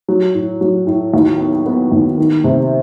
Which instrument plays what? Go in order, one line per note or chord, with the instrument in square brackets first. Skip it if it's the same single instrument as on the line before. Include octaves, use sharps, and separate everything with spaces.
[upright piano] F#3
A2
F#3
A2
D#2
B3
B3
D#2
D#3
C3